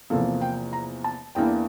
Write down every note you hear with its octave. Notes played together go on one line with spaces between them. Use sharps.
E2 C3 F3 A#3 A4
G5
A#5
A5
E2 E3 A#3 D4 G5